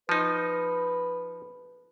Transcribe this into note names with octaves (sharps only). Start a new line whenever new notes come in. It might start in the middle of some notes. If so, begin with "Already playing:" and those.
F3 D#4 B4